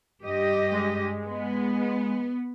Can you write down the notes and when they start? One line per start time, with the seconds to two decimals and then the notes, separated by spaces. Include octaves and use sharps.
0.23 G2 G4 D#5
0.72 G#3
1.26 B3